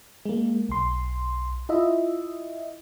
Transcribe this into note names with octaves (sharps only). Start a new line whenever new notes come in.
G#3 A#3
B1 C6
E4 F4 D#5 E5